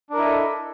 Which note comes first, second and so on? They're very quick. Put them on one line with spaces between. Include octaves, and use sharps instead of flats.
D4 A#4 E4 D#5 A4